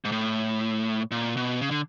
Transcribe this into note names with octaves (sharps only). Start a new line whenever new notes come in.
G#2
A2
A#2
B2
C#3
D3